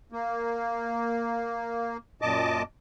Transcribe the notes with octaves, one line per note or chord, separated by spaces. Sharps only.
A#3
F#2 A#2 D#5 A5 D6